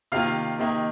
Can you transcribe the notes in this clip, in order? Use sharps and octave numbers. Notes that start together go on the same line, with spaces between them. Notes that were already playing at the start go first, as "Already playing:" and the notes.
C3 D#3 A#3 F4 F5
C3 D#3 A#3 D#4